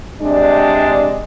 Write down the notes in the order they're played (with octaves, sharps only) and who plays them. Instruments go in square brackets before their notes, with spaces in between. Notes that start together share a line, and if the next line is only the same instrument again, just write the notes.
[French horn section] C3 G#3 D4